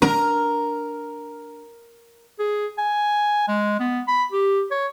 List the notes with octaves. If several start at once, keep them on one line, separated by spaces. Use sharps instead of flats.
D4 A#4
G#4
G#5
G#3
B3
B5
G4
C#5